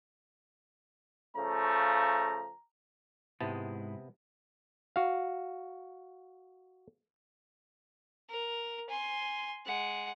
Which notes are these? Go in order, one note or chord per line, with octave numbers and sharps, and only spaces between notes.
C#3 F3 A3 A#5
G#2 C3 G#3 B3 E4 A5
F#4 F5
A#4
G#5 C6
G#3 F#5